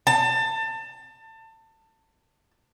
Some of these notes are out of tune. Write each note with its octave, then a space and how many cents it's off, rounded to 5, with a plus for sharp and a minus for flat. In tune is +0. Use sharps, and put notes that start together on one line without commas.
A5 +25